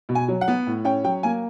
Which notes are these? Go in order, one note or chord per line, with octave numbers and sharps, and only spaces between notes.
B2
G#5
F#3
F#5
B3
A2
C#4 G5
F#3 G5
A#3 G#5